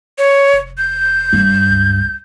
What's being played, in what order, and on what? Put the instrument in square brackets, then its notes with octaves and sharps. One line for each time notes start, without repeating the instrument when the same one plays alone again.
[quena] C#5
[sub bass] F1
[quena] G6
[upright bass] G2
[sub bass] C#2